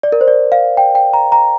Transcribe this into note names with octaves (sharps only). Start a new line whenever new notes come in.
D5
A#4
C5
D5
F5
G5
G5
A#5
A#5